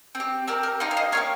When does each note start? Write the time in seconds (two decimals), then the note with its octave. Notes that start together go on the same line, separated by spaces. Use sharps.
0.15 C4
0.20 G4
0.48 C4 G4 A#4
0.63 A#4
0.80 A#3 D#4 G4 C5
0.91 F5
0.97 C5 D#5
1.12 A#3 D#4 G4 C#5 F5